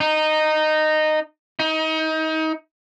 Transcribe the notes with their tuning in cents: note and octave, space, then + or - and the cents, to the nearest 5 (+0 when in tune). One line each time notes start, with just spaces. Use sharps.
D#4 -10
D#4 +30